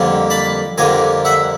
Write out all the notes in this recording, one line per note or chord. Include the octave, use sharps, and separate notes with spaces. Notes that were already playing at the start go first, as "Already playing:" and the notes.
Already playing: F2 D3 G3 A#3
A5 B5
F2 D3 G3 A#3 G#5 A#5
E5 F#5